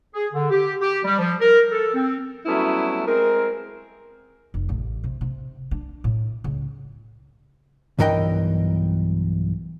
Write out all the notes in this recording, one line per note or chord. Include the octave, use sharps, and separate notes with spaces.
G#4
D3
G4
G4
G3
F3
A#4
A4
C4
F#3 G3 A3 B3 C#4 E4
G#3 C4 G#4 A#4
F1
A1
C3
C3
D4
A2
C#2
B1 G2 E3 A#4 D#5 G5